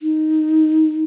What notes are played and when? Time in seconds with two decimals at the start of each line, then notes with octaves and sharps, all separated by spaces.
0.01 D#4